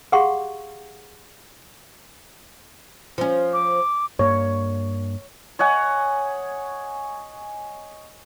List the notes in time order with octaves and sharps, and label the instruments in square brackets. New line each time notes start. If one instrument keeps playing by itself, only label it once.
[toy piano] G4 G#4 F5 F#5 C6 C#6
[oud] F3 C#4
[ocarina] D6
[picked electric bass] G2 A#3 [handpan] C#5
[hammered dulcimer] C#5 D#5 F#5 G#5